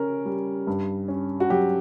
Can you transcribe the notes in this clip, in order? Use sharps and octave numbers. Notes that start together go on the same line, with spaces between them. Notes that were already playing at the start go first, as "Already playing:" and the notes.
Already playing: C#3 C#4 A#4
G3
G2
C#4
F#4
F#3 G4